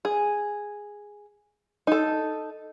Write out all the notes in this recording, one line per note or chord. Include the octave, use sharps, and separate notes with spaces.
G#4
D#4 A4